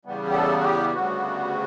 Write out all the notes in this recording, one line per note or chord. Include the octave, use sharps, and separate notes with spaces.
E2 C#3 G3 B3
G4
A4
F#4
G4
D2 C#3 G3 B3 F#4